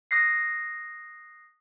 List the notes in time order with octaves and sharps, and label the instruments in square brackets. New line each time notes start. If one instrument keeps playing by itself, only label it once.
[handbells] D#6 F#6 A#6 C7